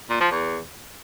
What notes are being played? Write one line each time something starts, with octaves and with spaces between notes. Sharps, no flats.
A#2
F3
E2